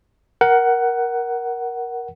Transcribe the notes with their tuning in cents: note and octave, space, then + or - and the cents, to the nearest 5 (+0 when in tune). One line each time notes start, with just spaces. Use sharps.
A#4 +15 F#5 +15